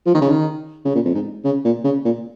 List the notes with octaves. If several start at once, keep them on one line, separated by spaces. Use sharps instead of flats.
F3
D#3
C#3
D#3
C#3
A#2
F2
G#2
C#3
A#2
C#3
A#2